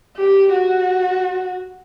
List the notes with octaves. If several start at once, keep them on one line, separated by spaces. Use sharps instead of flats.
G4
F#4